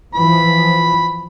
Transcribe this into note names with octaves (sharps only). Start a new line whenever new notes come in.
E3 F3 B5